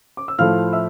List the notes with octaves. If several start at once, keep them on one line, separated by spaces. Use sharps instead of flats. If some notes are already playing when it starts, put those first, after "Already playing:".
D6
E6
A2 F3 A3 F5 F6
E5 E6